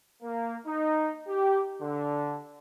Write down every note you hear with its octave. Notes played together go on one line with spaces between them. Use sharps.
A#3
D#4
G4
D3